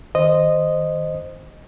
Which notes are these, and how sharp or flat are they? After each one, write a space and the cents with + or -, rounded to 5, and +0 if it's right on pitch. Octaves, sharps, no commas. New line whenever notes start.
D#3 +0 C5 +0 D#5 -10